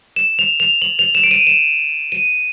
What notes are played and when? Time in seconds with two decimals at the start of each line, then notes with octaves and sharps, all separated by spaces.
0.16 E7
0.39 F7
0.60 F7
0.82 F#7
0.99 F7
1.15 E7
1.24 D7
1.31 D#7
1.47 E7
2.12 D#7